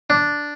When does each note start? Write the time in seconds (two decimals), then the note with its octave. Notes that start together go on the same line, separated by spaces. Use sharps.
0.10 D4